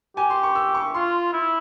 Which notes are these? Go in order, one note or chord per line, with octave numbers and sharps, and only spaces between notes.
G4 G#5
C6
C#6
E6
C#6
F4 C6
E4